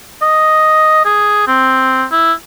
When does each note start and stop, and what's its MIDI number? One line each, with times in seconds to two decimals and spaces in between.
0.22 1.01 75
1.05 1.45 68
1.47 2.04 60
2.12 2.33 64